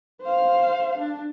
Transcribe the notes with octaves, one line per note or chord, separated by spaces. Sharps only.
C5 F5
D4